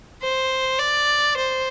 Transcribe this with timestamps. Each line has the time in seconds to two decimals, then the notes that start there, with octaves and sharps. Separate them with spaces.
0.22 C5
0.79 D5
1.37 C5